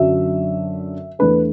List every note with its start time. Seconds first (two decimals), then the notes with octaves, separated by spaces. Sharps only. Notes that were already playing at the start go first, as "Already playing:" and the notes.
Already playing: F#2 D3 F#3 D4 E5
1.19 E2 E3 A3 D4 B4